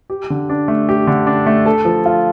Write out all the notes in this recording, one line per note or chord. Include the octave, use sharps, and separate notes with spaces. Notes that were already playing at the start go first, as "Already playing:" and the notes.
G4
D3
D4
A3
G4
D3
D4
A3
A4
F3
F4